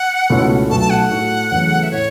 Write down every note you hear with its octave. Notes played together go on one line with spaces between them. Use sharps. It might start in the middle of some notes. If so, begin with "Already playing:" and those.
Already playing: F#5
C#2 B2 A3 C#4 E4
B1 B2 A3 F#4 A5
A5
F#5
A2 A3 F#4
E2 C#3 F#3 A3
E5
A2 A3 C#5